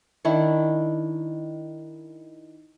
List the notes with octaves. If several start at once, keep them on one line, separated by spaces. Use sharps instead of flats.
D#3 D4 E4 C#6